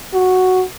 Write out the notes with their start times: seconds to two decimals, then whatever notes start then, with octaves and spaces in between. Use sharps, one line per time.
0.13 F#4